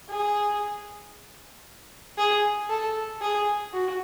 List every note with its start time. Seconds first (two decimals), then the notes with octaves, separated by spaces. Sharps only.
0.09 G#4
2.18 G#4
2.69 A4
3.21 G#4
3.73 F#4